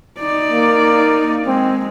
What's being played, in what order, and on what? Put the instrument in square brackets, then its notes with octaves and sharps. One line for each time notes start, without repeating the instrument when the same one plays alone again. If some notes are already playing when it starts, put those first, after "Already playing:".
[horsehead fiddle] D#4 D5
[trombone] A#3
[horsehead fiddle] G#3 [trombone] C4